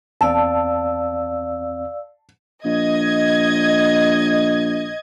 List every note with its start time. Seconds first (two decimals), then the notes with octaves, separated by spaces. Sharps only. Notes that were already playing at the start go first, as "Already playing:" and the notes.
0.21 E2 C4 D5 F5 A5 E6
2.65 A#1 D#5 G#6